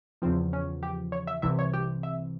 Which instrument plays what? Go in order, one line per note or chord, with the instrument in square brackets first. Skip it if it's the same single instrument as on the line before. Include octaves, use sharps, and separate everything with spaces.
[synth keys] E2 C#3 F3 C4
C#4
G4
C#5
E5
C2 C3 E3 E5
C#5
G4
E5